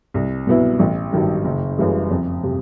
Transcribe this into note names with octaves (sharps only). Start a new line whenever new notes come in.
C2
B2 F#3 B3 E4
A1
G2 D#3 F#3
F#1
F#2 C#3 E3 G3
F2
C3